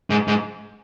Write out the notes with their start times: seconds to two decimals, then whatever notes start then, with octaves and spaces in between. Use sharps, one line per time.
0.10 G#2
0.28 G#2